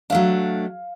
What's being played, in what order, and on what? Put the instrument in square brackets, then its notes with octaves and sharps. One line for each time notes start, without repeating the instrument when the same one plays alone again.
[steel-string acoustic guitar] F#3 A3 D4 [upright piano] F5